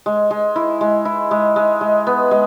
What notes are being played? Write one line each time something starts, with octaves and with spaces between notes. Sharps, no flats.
G#3
G#3
E4
G#3
E4
G#3
G#3
G#3
B3
G#3